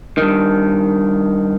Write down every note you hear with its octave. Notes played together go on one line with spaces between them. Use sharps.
G2 D#3